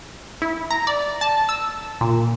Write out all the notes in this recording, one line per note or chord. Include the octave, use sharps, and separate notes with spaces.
E4
A#5
D5
A5
E6
A#2